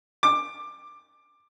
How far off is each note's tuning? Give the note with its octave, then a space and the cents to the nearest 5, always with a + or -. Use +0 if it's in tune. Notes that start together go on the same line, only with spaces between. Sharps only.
D6 +15